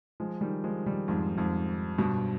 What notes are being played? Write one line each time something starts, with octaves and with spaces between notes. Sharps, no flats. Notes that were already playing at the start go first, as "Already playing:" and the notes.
F3 G#3
D#3 G3
F3 G#3
D#3 G3
F2 G#2
F2 G#2
G2 B2